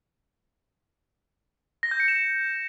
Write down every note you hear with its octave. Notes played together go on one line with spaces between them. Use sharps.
A#6
G6
C#7
E7